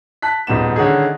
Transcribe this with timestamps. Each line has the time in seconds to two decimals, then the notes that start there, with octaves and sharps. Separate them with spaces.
0.22 A5 F#6 B6
0.47 D#1 G#2 B3 E7
0.76 D3 D#3 C#4 D#4 E4 G#4